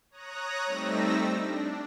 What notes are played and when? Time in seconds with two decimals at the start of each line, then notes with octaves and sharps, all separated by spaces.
0.11 C#5 A#5 D#6 F#6 A#6
0.66 G3 A3 C4 D#4 E6 A#6
1.40 D4